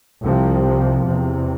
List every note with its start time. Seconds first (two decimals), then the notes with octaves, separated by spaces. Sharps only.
0.23 C2 C3 F3
0.64 F3
1.05 E2 C3